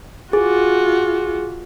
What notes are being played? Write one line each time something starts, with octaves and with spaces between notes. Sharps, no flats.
F4 F#4 G#4